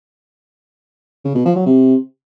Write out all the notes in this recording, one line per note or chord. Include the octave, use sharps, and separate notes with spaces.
C#3
B2
F3
F#3
C3